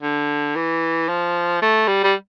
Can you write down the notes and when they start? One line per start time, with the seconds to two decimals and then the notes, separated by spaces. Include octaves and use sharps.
0.02 D3
0.56 E3
1.09 F3
1.62 A3
1.87 G3
2.04 G3